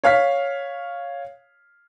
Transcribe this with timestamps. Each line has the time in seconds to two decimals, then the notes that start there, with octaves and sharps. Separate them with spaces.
0.04 C#5 F5 F6 B6